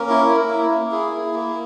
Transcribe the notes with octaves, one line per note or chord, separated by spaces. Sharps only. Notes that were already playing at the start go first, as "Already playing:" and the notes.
Already playing: A#3 C#4 A#4
E4
E4
A#3
A#3
E4 G#4
E4
A#3